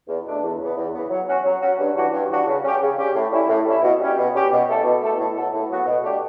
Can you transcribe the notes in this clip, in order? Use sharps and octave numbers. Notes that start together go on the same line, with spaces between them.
E2
B2 A3 D4
E2
C#3 E3 B3
E2
C#3 E3 B3
F#3
C#4 F#4
F#3
C#4 F#4
G2
E3 G3 D4 F#4
G2
E3 G3 D4 F#4
C#3
G3 C#4 G4
C#3
G3 C#4 G4
A2
G3 C#4 E4
A2
G3 C#4 E4
B2
G3 C#4 G4
B2
G3 C#4 G4
B2
A3 E4 A4
B2
A3 E4 A4
A2
F#3 B3 F#4 A4
A2
F#3 B3 F#4 A4
B2
A3 D4 G4